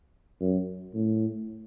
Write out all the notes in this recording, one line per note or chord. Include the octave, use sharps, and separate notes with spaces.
F#2
A2